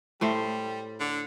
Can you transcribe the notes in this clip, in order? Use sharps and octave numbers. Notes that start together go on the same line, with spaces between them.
A2 G3 A3 C5
D3